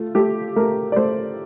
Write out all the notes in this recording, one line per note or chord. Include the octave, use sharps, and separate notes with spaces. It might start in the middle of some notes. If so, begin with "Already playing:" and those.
Already playing: A3 F4
A3 G4
A3 A#4
D5
A3 C5